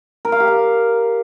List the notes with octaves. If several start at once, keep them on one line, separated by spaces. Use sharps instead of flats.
A#4
F5
G4
F5